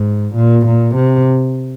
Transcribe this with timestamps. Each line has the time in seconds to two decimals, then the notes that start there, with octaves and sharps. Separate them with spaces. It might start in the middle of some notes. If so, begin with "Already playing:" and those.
Already playing: G#2
0.35 A#2
0.66 A#2
0.95 C3